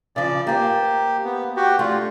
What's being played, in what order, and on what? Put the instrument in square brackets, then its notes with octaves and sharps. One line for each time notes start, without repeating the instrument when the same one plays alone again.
[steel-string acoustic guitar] C#3 F3 [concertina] D5
[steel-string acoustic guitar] A#3 C5 [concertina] G4
[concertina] B3
F#4 G4
[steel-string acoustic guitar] A3 D4 [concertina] F4